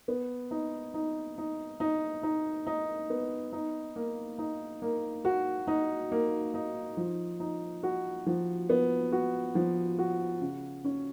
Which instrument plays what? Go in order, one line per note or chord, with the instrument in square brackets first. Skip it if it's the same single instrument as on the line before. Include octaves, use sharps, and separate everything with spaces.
[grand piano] B3
D#4
D#4
D#4
D#4
D#4
D#4
B3
D#4
A#3
D#4
A#3
F#4
D#4
A#3
D#4
F3
D#4
F#4
F3
B3
F#4
F3
F#4
C#3
C#4